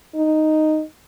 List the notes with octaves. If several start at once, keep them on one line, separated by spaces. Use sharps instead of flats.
D#4